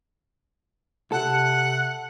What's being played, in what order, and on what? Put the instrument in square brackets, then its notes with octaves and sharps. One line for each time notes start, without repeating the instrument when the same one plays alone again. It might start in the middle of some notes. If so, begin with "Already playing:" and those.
[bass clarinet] C3 [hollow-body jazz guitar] A4 [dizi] F#5